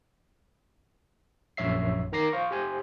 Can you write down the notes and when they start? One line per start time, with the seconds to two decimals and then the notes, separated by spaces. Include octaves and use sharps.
1.57 A#1 F#2 C#5 E5 C7
2.12 D#3 A#4 A#5 D6 A#6 C7
2.33 C5 F5 C#6
2.51 G4 C5 G#5